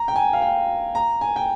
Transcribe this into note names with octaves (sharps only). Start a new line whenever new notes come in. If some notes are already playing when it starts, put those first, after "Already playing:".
Already playing: A#5
G5
G#5
F5
G5
A#5
G#5
G5